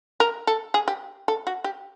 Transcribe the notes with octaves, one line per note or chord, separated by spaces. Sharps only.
A#4
A4
G#4
G4
A4
F#4
G4